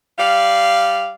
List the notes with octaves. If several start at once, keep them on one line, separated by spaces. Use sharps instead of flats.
G3 D5 F5